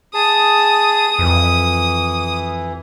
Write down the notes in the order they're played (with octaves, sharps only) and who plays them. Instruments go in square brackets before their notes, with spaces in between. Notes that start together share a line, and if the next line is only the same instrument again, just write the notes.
[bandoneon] G#4 A5 [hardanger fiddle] D#6
[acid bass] F2 [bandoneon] E3